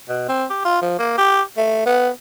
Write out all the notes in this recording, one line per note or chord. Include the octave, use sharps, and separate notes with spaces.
B2
C4
G4
F4
F3
A#3
G4
A3
B3